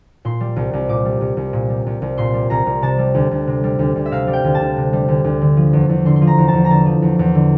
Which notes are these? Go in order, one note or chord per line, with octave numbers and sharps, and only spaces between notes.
A#2 C6
G3
C2
C2
A#2 D6
G3
C2
C2
A#2
G3
C2
C2
A#2 C6
G3
C2 A#5
C2
C3 A5
G3
D2
D2
C3
G3
D2
D2
E5
C3 F5
G3
G5
D2
A5
D2
C3
G3
D2
D2
D3
F3
E2
E2
D3 C6
C6
F3
A#5
E2
A5
E2
A#5
D3 A5
F3
E2
E2
D3